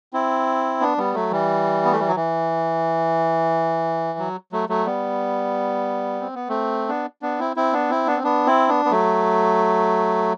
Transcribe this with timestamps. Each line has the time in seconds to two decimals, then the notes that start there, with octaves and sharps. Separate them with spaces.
0.13 C4 E4
0.80 B3 D4
0.98 G3 B3
1.14 F#3 A3
1.31 E3 G3
1.85 B3
1.92 A3
2.00 G3
2.08 F#3
2.16 E3
4.19 F#3
4.52 F#3 A3
4.69 F#3 A3
4.86 G3 B3
6.21 C4
6.35 B3
6.49 A3 C4
6.89 B3 D4
7.22 B3 D4
7.39 C4 E4
7.56 C4 E4
7.73 B3 D4
7.90 C4 E4
8.07 B3 D4
8.16 C4
8.24 B3 D4
8.46 C4 E4
8.69 B3 D4
8.85 B3
8.91 F#3 A3